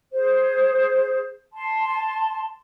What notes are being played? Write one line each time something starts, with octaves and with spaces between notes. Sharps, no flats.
G#4 C5
A5 C6